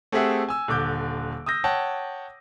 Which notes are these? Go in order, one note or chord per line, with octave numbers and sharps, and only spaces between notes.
A3 C4 G4 G#4 E5 F#5
G#5 E6
D#1 D3 D6 G6
D#6 E6 G6 A#6
C#5 F#5 G5 A5